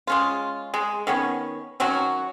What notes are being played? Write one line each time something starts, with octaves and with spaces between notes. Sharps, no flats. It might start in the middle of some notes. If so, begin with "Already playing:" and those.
G#3 C#4 F4
G#3
D#3 B3 C#4
D#3 F#3 C#4 F#4